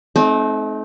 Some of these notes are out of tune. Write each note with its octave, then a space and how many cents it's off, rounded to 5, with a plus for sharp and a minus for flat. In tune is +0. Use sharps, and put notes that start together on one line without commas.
A3 -40 C4 +0 D#4 +0